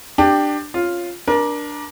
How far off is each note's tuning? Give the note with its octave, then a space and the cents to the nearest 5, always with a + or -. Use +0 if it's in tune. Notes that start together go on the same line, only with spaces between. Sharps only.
D4 +15 G4 +0
C#4 -15 F4 +0
D4 +0 A#4 +30